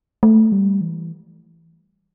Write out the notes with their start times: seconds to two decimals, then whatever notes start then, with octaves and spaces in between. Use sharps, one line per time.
0.23 A3
0.52 G3
0.81 E3